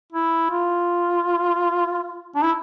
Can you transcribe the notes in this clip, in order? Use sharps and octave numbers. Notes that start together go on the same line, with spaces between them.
E4
F4
D4
E4